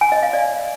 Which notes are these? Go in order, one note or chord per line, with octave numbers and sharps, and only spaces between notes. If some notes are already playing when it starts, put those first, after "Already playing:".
G#5
D#5
F5
D5